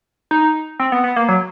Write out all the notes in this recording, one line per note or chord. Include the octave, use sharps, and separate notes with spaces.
D#4
C4
B3
B3
A#3
F#3